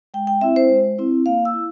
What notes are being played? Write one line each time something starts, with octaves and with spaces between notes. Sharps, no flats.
G#3 G5
G5
C4 E4 E5
C5
G#3
C4 E4
A#3 F5
E6
E4